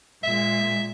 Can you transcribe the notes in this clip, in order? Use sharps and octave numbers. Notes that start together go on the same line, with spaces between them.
A#2 G#3 E5